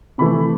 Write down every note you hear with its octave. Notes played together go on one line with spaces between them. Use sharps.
C3 E3 A3 B5